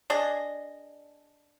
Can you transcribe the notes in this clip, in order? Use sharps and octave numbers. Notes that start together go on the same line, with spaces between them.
D4 G#4 D5 D#5